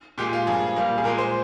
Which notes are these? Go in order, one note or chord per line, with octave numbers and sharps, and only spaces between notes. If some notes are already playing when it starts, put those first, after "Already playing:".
A#2 G#3 G4
F4
G2 F3 A#3 G#4
A#2 G3 A#3
G#4
A#2 G#3 A#4
C5